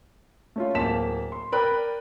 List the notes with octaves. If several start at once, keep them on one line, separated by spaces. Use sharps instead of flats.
A3 C#4 F4
D1 A#3 A5 B6 E7
C6
A#4 B4 D5 G5 B5 F#6